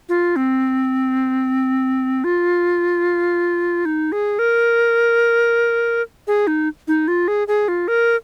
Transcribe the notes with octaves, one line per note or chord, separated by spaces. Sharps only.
F4
C4
F4
D#4
G#4
A#4
G#4
D#4
D#4
F4
G#4
G#4
F4
A#4